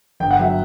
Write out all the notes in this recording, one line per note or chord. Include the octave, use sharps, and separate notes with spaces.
G1 G5
F#5
F#3 E5